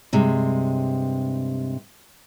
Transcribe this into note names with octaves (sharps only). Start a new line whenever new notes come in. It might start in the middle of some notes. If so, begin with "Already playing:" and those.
G2 C3 G#3